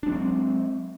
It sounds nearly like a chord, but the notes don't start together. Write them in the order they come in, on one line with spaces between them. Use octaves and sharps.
D4 G#3 F#3 C4